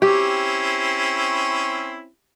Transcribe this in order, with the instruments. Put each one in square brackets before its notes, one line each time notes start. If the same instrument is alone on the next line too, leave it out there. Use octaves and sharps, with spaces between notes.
[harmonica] C4 C#4 E4 [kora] G4